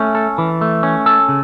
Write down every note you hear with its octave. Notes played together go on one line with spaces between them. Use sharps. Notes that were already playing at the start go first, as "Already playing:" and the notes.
Already playing: A3 C#4
A4
E3
A3
C#4
A4
C#3